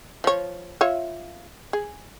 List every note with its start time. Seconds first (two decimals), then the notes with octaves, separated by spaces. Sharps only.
0.24 F3 C#5
0.81 F4 C#5 E5
1.73 G#4